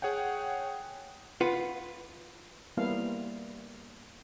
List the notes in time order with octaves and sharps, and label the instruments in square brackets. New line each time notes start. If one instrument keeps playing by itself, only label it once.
[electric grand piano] G#4 C#5 F#5 G5
[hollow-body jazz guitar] F4 B4 F#5
[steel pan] G3 A#3 B3 E4 F5